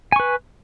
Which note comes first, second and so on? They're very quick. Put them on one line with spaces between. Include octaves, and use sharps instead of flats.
G#5 C#6 B4